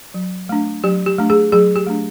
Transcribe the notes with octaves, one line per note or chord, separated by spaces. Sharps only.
F#3
A3 D4
F#3 G4
G4
A3 D4
G#4
F#3 G#4
G4
A3 D4